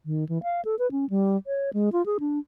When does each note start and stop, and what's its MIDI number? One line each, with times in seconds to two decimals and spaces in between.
0.06 0.27 51
0.29 0.41 52
0.43 0.61 77
0.65 0.75 69
0.79 0.90 71
0.91 1.08 61
1.10 1.37 55
1.47 1.70 73
1.73 1.89 56
1.93 2.05 65
2.06 2.18 68
2.20 2.39 62